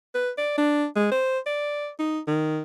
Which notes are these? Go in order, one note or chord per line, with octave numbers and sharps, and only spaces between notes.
B4
D5
D4
G#3
C5
D5
D#4
D#3